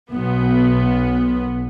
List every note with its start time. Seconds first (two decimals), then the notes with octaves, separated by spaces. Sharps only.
0.12 B1 B3